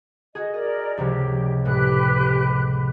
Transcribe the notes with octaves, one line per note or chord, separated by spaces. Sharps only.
F#4 G#4 D#5
A#4 D5 D#5
C#2 C3 F3 G4
A2 G#3 G4 B4 F#6